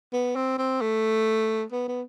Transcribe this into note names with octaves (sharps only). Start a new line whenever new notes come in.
B3
C4
C4
A3
B3
B3